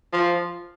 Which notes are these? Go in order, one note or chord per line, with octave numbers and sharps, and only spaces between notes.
F3